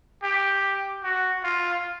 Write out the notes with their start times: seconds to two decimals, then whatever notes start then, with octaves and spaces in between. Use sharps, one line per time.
0.23 G4
1.04 F#4
1.44 F4